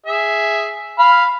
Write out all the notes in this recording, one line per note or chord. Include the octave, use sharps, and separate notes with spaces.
G#4 E5
F5 B5